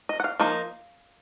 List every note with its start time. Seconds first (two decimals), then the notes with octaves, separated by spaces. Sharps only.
0.09 D#5
0.20 F#5
0.24 F5
0.40 F3 A#3 D#4